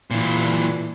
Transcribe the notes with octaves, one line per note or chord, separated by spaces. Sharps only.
A#2 E3